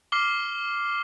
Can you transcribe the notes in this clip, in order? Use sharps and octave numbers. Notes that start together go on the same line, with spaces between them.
D6 F6 C7 G7